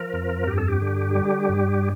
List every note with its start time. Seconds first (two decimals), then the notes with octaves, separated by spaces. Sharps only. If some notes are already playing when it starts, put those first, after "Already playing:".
Already playing: F3 A#4
0.13 F2
0.47 G2 G4
0.58 A4
0.68 G4
0.81 D3
1.15 G3
1.49 G2